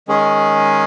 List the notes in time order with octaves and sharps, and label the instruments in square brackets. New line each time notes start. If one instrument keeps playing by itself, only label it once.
[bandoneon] D#3 G#3 C#4 G#4